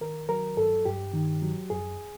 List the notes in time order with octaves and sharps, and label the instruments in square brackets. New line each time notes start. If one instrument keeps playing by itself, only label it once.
[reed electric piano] D#3 A#4
F#3 A#4
G2 A4
G2 G4
D#3
F#3
F#2 G#4